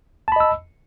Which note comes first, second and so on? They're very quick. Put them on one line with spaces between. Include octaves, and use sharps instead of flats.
A5 B5 D#5 E6